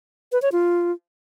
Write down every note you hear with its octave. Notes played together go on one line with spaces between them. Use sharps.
B4
C#5
F4